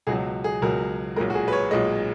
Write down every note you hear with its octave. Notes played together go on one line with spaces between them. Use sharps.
C#2 B2 F#3 G#4
G#4
C#2 B2 F#3 A#4
B1 A#2 G#3 A#4
F#4
G#4
B4
C#5
B1 A#2 G#3 D#5